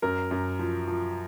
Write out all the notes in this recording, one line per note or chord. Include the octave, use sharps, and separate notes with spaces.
F#2 A#4
F#2
F3
F3